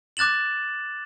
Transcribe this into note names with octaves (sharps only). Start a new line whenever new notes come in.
D6 F#6 A6 E7 F#7